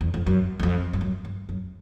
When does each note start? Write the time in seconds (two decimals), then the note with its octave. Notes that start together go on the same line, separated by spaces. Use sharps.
0.01 E2
0.14 F2
0.27 F#2
0.60 F#2
0.63 F2
0.93 G2
1.01 F#2
1.25 G2
1.49 F#2